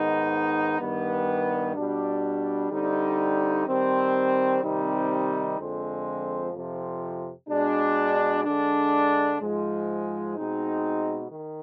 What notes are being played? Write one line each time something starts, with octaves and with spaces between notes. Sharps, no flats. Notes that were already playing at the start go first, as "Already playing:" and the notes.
Already playing: G#2 D#3 B3 D#4
G2 D#3 G3 B3
B2 G3 D4
D3 G3 C4 D#4
D#3 G3 C4
C3 D#3 G3 C4 D#4
F2 D3 F3 G#3 C4
F2 C3 F3
B2 G#3 D4
D3 G#3 D4
G#2 F3 G#3
B2 G#3 C4 D#4
D#3